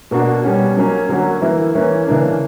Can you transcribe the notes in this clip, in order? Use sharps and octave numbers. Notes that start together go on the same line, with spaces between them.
B2 A#3 D4 F#4
B2 G3 C#4 F#4
F#3 A#3 C#4
D3 F#3 A#3 C#4 F#4
E3 A#3 E4
E3 A#3 C#4
C#3 E3 A#3 D4